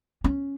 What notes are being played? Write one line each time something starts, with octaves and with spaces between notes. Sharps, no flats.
C#4